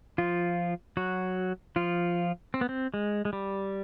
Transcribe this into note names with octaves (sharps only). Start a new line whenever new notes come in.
F3 F4
F#3 F#4
F3 F4
C4
B3
C4
G#3
G#3
G3